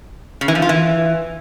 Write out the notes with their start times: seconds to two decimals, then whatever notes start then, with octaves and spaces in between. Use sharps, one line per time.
0.41 C#3
0.48 E3
0.55 F3
0.62 F4
0.69 E3